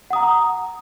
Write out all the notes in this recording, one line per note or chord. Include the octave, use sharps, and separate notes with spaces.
F#5 A#5 D#6